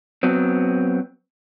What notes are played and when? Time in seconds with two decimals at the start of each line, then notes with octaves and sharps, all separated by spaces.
0.23 F#3 B3 C4